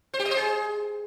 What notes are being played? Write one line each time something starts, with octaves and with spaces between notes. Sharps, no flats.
C5
G4
D#5
C5
G#4